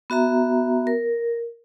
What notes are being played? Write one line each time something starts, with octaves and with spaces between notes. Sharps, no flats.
B3 F#4 E5 A#5
A#4